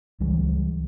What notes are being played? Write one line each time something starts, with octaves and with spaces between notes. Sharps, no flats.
C#2 E3 F#3 G3